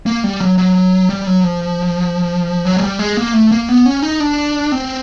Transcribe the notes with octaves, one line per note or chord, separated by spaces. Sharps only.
A#3
G3
F#3
F#3
G3
F#3
F3
F#3
G#3
G3
G#3
A#3
A3
A#3
B3
C#4
D#4
D4
C4